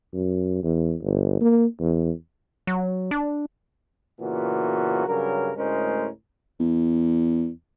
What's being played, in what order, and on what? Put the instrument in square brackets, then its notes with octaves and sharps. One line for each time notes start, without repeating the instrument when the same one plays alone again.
[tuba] F#2
E2
G1
A#3
E2
[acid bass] F#3
D4
[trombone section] A#2 C#3 E3 B3 F#4 A#4
G2 C#3 F#3 A#4
D2 A2 G#3 C#4 A#4 C5
[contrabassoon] E2